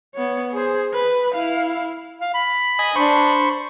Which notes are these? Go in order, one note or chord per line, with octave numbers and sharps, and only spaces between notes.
B3 C#5
G#4 C5
B4
E4 F5
F5
B5
D#5 G#5
D4 C5 B5 C#6